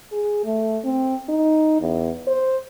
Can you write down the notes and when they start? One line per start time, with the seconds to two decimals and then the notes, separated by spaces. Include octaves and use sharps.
0.12 G#4
0.45 A3
0.84 C4
1.29 D#4
1.81 E2
2.27 C5